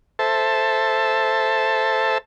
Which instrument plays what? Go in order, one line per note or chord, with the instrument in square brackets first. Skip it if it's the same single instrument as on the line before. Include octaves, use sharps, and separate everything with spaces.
[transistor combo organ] A4 C5 E5 A5